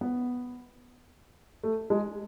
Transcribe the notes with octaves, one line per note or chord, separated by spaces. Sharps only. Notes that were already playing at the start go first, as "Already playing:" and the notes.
B3
A3
G#3